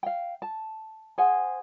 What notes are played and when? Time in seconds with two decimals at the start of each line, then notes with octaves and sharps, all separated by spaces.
0.03 F5 G5
0.42 A5
1.18 G#4 C5 F#5 G#5